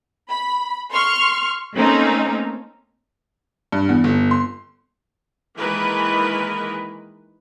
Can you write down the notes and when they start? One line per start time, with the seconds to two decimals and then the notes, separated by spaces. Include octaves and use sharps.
0.29 B5
0.91 C6 C#6 F6
1.75 A3 A#3 C4 C#4 D#4
3.72 G2
3.89 E2
4.04 G1
4.31 C6
5.57 D#3 E3 G#3 A#3 A#4 B4